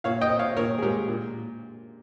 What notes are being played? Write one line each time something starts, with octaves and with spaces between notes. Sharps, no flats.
A#2 C#5 F5
D#5 G5
C4
C#5 F5
A#2 A#4 C#5
G#4
G#3 G4 A#4
A#2